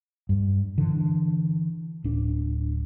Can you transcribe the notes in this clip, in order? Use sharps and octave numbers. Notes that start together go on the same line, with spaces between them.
G2
D3 E3
D1 D4